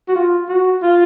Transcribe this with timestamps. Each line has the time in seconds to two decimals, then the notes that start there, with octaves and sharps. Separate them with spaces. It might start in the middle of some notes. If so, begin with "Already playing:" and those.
0.08 F#4
0.15 F4
0.49 F#4
0.82 F4